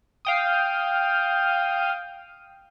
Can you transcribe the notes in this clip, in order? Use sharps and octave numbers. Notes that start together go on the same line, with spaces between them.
F5 G5 D#6